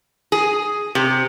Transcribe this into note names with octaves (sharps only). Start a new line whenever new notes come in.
G#4
C3